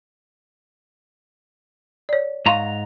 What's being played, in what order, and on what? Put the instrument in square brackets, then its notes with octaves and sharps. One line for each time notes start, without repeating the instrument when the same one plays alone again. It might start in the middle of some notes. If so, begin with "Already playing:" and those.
[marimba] C#5 D5
[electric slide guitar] G#2 A#5 [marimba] F5 C6 C#6